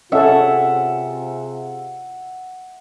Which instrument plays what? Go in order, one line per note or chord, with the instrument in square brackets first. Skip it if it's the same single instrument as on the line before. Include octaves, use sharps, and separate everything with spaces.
[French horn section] C3 F4 G#4 [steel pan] C#4 A4 [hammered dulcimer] E5 F#5